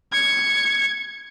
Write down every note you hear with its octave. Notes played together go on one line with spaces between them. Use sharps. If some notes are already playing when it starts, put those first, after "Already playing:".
G#6 C#7